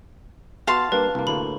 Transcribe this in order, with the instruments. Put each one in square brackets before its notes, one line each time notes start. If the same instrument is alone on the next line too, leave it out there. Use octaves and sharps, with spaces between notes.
[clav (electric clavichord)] B3 F#4 [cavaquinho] F5 A5 C6
[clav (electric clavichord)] G3 A#3 D4 [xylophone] B4
[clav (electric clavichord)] C2 A#3
[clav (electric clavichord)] D2 A2 A#3 [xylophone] B5